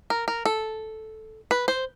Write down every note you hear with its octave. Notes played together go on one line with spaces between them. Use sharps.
A#4
A#4
A4
B4
C5